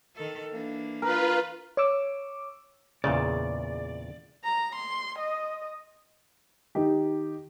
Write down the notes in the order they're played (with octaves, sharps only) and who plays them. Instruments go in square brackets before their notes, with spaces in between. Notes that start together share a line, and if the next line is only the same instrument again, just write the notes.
[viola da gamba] D#3 A4
E3 A#3 D4
[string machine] F4 B4 [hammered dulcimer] A#4
[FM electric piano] C#5 C#6 D6 E6
[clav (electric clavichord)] E2 A#2 C#3 [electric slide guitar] D5
[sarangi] A#5
C6
D#5
[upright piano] D#3 D#4 G4